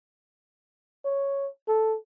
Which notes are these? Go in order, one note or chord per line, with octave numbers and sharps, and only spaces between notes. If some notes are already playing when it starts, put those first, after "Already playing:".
C#5
A4